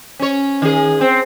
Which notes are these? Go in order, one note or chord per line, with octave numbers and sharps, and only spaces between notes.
C#4 C#5
D#3 G#4
C4